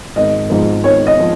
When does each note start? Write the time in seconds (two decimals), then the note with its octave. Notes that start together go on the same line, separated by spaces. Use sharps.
0.16 G#1 D#5
0.50 G#2 F3
0.84 G#1 C#5
1.07 D#5
1.20 F3